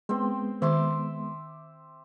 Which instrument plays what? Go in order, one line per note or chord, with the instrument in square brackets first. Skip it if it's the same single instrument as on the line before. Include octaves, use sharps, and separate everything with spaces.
[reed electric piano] G#3 B3 [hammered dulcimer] C4 C5 G5
[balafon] D#3 [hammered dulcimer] E5 C6 D6